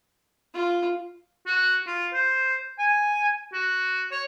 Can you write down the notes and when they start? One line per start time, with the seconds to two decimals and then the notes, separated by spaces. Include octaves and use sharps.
0.54 F4
1.47 F#4
1.87 F4
2.13 C5
2.79 G#5
3.53 F#4
4.11 C#5